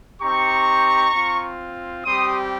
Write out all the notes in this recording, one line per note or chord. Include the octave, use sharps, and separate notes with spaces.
C4 D#4 G4 A#5 C#6
C4 F4
G3 C4 G4 C6 D#6